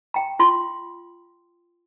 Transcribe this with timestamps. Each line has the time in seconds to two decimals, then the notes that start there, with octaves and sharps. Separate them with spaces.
0.14 G5 A#5
0.39 F4 C6